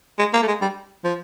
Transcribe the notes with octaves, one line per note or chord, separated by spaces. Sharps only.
G#3
A#3
A3
G#3
G3
F3